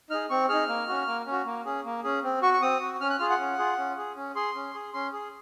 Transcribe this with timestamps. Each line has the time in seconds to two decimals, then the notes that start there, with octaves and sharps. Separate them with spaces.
0.10 D#4 G#4 F6
0.30 C4 C#6
0.49 D#4 G#4 F6
0.68 A#3
0.88 C#4 F#4
1.07 A#3
1.27 C#4 F#4
1.46 A#3
1.65 C#4 G#4
1.85 A#3
2.04 C#4 G#4
2.24 C4
2.42 F#4 C#6
2.54 C#6
2.62 C4 D#6
2.81 F#4
3.00 C#4 F6
3.10 F#6
3.19 F4 G#4 F6
3.30 F#5
3.39 C#4
3.59 F4 G#4
3.78 C#4
3.97 G#4
4.16 C#4
4.35 G#4 C6
4.55 C#4
4.74 G#4
4.94 C#4 C6
5.13 G#4